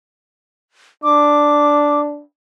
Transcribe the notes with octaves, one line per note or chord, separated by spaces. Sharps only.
D4 D6